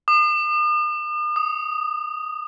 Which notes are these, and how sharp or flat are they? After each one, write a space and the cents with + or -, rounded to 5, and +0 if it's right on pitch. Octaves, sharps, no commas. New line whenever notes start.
D#6 -45
D#6 +0